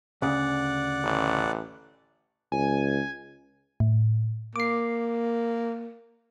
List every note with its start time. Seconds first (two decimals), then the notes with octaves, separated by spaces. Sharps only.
0.22 D2 C#3 D5 F#5
1.04 A1
2.52 C#2 G#5
3.80 A2
4.56 A#3 D6 C7